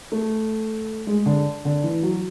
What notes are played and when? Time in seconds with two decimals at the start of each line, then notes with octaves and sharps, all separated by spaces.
0.12 A3
1.07 G#3
1.26 D3
1.65 D3
1.84 E3
2.03 F#3